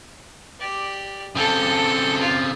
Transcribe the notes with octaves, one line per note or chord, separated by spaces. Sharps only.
G4 D5
C#3 C4 A4 A5
F4